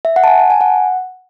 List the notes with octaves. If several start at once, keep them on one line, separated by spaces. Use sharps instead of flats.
E5
F#5
A5
G#5
A5
G#5
F#5